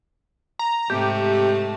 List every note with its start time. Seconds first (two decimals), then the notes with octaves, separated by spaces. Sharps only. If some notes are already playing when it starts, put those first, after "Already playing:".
0.59 A#5
0.90 G#2 C3 A3 G4